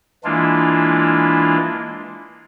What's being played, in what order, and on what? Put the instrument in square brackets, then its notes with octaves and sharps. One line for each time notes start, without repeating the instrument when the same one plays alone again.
[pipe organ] E3 G#3 A#3 D4 E4 F4